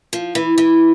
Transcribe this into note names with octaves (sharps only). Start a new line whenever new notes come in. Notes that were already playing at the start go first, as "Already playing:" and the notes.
F3
E3
E3